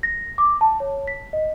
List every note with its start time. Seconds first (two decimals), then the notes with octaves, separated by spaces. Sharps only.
0.03 A#6
0.38 D6
0.61 A5
0.80 C#5
1.07 B6
1.33 D#5